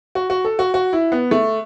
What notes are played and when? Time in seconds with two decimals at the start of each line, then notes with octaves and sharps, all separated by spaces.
0.15 F#4
0.30 F#4
0.45 A4
0.59 F#4
0.74 F#4
0.93 E4
1.12 B3
1.31 A3